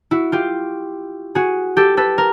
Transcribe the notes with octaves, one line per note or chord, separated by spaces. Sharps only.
E4 F#4
F4 G4
F#4 G#4
G4 A4
A4 B4
A#4